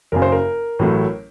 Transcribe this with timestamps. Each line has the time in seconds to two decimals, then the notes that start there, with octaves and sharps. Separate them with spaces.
0.12 F#1 F#2 C#3 A#4
0.22 C5
0.32 A#4
0.79 A1 A2 F#3 A3